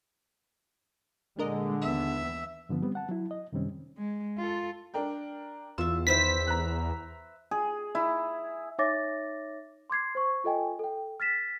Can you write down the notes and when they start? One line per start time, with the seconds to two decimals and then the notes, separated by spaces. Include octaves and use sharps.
1.39 A#2 D3 G#3 D4 A#4 D#5
1.81 D#2 E3 B3 E5
2.69 G2 D3 F3 B3
2.82 G3 B3 C4
2.95 F#5 A5
3.09 F#3 E4
3.31 D#5
3.52 F#2 C3 D#3 G3 C4 C#4
3.98 G#3
4.38 F4 A4
4.94 D4 A#4 G5
5.78 E2 F4 E5 E6
6.07 D#3 B4 C5 E5 B6
6.47 A#5 F#6
7.51 G#4
7.95 E4
8.79 D#4 C#5 E5 D6 A6 A#6
9.90 C6 D6 G#6 C7
10.15 C5 C#6
10.44 F4 A4 D#5 G5 G#5
10.79 A4 G5
11.20 F6 A6 B6 E7